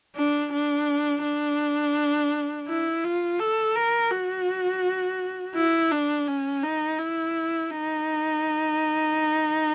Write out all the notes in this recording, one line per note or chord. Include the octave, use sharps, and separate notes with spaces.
D4
D4
D4
E4
F4
A4
A#4
F#4
E4
D4
C#4
D#4
E4
D#4